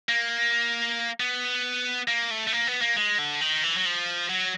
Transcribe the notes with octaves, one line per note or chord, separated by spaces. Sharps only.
A#3
B3
A#3
A3
A3
A#3
B3
A#3
G#3
D3
D#3
E3
F#3
F3
F#3